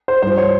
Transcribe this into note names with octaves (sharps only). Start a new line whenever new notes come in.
C5
G2 F3 C5
C#5